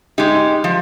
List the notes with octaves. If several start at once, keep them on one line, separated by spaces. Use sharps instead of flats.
G#3 D#4 G4
F3